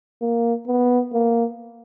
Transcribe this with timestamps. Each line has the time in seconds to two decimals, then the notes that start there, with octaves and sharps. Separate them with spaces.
0.22 A#3
0.68 B3
1.13 A#3